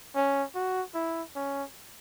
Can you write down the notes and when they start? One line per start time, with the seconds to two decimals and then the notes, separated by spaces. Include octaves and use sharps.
0.16 C#4
0.55 F#4
0.94 E4
1.35 C#4